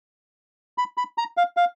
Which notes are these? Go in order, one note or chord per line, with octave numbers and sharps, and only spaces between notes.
B5
B5
A#5
F5
F5